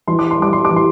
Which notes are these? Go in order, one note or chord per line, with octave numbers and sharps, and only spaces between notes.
E3 C6
D6
C6
G3 D6
C6
D6
E3
C6